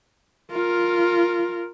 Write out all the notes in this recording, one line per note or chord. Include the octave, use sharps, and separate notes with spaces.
F4 A#4